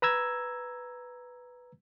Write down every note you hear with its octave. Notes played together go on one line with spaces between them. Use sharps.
B4 A#5 E6 G#6